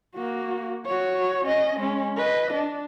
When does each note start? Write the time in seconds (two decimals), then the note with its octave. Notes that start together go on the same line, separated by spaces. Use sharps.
0.15 A#3 F#4
0.86 F#4 C#5
1.45 C#4 D#5
1.80 G#3 C#4
2.17 B4 D#5
2.54 D4